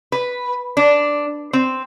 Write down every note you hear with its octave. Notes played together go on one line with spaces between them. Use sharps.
B4
D4
C4